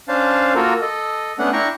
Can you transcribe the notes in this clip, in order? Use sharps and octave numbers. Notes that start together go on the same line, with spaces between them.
C#4 D4 C5 F5 A5
A#3 F4 F#4 A4 A#4
A4 D#5
A3 B3 C#4 D4 F#5
D4 E4 G5 A#5 C#6